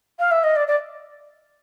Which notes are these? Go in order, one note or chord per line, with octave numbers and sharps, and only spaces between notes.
F5
E5
D#5
D5
D5